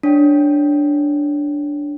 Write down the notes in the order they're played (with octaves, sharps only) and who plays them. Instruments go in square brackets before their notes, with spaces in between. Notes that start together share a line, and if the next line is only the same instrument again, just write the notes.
[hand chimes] D4 C#5 G5